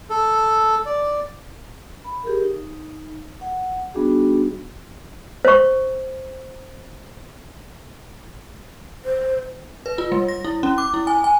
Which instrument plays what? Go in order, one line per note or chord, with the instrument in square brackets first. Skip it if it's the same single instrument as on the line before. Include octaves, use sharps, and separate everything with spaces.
[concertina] A4
D5
[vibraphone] B5
G4 G#4 A#4
D#4
F#5
G3 B3 D4 D#4 F#4 G#4
[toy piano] C5 C#6
[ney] C5
[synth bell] B4
F4
G3
A#6
E4
C#4
D6
E4
G#5
G#5